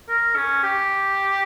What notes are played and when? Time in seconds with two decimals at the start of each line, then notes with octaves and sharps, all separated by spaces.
0.09 A#4
0.36 C#4
0.63 G4